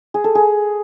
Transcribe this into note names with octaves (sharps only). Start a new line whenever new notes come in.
G#4
A4
G#4